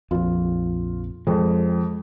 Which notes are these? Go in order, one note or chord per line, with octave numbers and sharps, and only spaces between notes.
A#1 F2 F4
F2 G#3